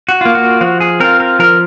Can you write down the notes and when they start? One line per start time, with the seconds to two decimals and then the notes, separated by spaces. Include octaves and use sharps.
0.09 F#4
0.21 A#3 F4
0.35 F#4
0.61 F3 F#4
0.81 G#4
1.00 C4 F4 A#4
1.20 A#4
1.39 F3 A#4